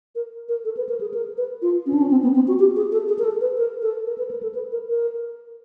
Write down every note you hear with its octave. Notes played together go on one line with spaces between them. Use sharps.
A#4
A#4
A4
B4
A#4
G#4
A#4
B4
F4
C#4
D4
C#4
C4
B3
C4
F#4
G4
G#4
A4
G#4
A#4
A4
B4
A#4
A4
A#4
B4
A#4
A4
B4
A#4
A#4